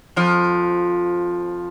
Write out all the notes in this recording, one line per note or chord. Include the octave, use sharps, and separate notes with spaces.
F2 F3